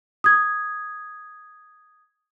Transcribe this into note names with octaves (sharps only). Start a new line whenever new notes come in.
D#6 G#6